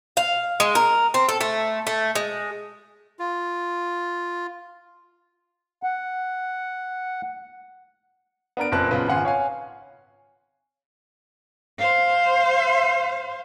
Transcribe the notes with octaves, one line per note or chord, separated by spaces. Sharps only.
F5
G#3
A#4
C4
A4
A3
A3
G#3
F4
F#5
B3 D4 A#4 D7
F#1 A#2 C4 B4 A5 F#6
B1 C#3 F4 B4
G#1 F4 F#5 G#5 C6
C#5 F5 G#5
C5 F5